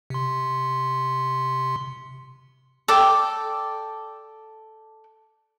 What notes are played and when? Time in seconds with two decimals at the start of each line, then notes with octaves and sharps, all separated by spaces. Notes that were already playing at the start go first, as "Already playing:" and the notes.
0.10 C3 C6
2.88 A4 D5 G5